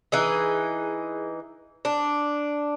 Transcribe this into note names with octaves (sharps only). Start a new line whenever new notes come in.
E3 D#4 G#4
D4